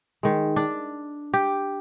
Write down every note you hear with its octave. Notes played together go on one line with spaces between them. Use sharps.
D#3 G#3
D4
G4